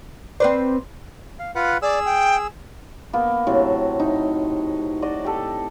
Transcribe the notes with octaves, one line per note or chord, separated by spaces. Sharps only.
C4 B4 C5 D5 C6
F5
F4 B4 F#5
G#4 D5 E6
G5
A#3 B3
A2 C3 F#3
D#4 E5
F#4 D5 D#5
G4 A4